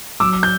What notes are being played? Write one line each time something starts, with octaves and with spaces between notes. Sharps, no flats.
F#3 D6 E6
G6